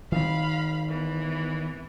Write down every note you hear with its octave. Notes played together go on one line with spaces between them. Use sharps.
D#3 C4 F5 B5
E3 B3